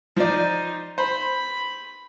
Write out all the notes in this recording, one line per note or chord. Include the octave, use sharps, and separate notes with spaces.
F3 D#4 C5 D5
C5 B5